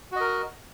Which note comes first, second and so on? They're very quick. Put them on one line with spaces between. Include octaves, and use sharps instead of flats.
F#4 D#5 A#4